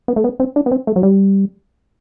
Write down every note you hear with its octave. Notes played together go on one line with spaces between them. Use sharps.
B3
A3
B3
C4
D4
B3
C4
A3
F#3
G3